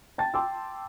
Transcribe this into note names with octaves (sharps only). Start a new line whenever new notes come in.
G5 A5 A6
G5 A5 C6 D6 E6